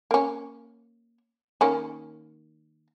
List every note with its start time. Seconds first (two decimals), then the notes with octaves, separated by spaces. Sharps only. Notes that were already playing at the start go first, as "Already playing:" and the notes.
0.11 A#3 C#4
1.61 D#3 A#3 C#4